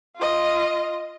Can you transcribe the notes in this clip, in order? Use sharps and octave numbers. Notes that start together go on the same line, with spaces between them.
F4 D#5